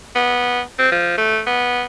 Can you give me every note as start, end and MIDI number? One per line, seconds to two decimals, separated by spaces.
0.15 0.61 59
0.79 0.90 60
0.92 1.17 53
1.18 1.40 57
1.46 1.85 59